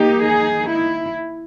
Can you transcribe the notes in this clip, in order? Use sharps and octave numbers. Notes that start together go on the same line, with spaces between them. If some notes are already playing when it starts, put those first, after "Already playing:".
Already playing: D#3 A#3 D#4 G4
G#4
E4